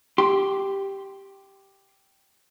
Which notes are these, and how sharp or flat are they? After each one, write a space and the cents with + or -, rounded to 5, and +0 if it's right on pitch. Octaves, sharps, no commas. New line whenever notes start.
G4 +0 C6 +0